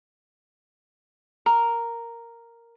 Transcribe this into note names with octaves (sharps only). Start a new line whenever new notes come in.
A#4